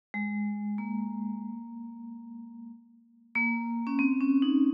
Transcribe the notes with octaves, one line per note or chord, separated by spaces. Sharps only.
G#3
A#3
A#3
C#4
C4
C#4
D#4